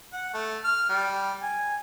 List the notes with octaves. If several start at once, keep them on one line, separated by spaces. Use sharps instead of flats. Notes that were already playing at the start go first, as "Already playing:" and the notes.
F#5
A3
F6
G3
G#5